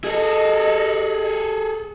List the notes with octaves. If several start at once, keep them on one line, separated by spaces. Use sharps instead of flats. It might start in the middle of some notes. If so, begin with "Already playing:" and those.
G#4 A4 D#5